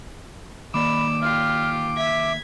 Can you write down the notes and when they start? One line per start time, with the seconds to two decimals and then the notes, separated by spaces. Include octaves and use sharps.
0.74 D#3 A#3 D5 B5 D6 E6
1.22 F4 G4 F6
1.97 E5 G#6 B6